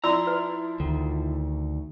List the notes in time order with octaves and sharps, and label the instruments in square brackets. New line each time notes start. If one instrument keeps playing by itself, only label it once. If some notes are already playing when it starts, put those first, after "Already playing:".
[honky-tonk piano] F3 E4 C6 [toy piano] D5 D6 E6 [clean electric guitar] A#5
[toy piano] B4
[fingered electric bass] D2 [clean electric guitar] D#3